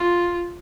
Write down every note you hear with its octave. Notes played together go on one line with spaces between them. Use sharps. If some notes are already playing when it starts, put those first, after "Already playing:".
Already playing: F4